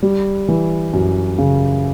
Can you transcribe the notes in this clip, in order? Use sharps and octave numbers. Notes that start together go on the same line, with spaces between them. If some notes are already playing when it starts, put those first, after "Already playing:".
G3
E3
F#2
C#3